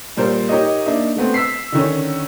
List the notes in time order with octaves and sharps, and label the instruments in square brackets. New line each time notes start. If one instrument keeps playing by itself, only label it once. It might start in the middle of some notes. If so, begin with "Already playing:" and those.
[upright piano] A#2 G3 A#4 C5
D#4 G4 A#4 C#5 D#5
A#3 D4 D#4 E5
A3 B3 C4
E6 B6 C7
D3 D#3 C#4